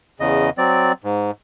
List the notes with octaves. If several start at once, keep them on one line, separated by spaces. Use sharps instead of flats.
E2 C#3 D#5
F#3 C4 D5
G#2